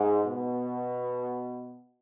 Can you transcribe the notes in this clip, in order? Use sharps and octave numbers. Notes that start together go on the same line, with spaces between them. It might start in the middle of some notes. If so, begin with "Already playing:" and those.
Already playing: G#2
B2